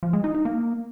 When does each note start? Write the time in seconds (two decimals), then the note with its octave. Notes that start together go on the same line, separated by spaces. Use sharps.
0.03 F3
0.13 G#3
0.24 D#4
0.35 D#4
0.45 A#3